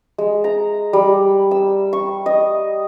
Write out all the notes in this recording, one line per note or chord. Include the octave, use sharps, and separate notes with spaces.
G#3
A#5
G3
E6
C#6
D#5